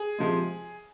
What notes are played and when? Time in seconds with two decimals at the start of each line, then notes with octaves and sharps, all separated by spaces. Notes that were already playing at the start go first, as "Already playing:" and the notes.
Already playing: G#4
0.18 C3 F3 G#3